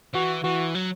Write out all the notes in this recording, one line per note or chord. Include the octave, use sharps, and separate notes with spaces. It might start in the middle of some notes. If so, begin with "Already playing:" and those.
E3 F#4
E3 F#4
F#3